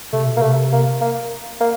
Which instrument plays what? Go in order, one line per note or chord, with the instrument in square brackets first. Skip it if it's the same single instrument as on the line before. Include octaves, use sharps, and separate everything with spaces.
[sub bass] C3 [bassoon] A3
[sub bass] B2
[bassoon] A#3
[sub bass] C3 [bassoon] A3
[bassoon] A#3
A#3
A#3